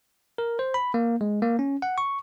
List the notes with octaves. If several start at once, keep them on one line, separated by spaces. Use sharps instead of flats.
A#4
C5
B5
A#3
G#3
A#3
C#4
F#5
C#6